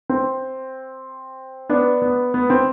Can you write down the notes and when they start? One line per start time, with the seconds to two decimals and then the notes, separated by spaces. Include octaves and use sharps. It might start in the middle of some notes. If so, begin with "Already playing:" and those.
0.10 C4
1.69 B3 D4
2.02 B3
2.34 B3
2.50 C4